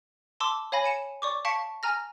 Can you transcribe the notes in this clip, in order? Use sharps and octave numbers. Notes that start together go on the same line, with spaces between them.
A5 C6 D6 E6
C#5 F5 G#5 B5 A#6
G#5 C#7 E7
D5 C#6 D6
F5 A5 C#6 B6 C#7 D7
G#5 A#5 F6 A#6